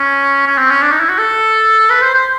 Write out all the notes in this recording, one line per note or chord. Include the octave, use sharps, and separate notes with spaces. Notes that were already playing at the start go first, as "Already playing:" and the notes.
Already playing: C#4
C#4
C4
C#4
D4
D#4
E4
F#4
A4
B4
C5
C5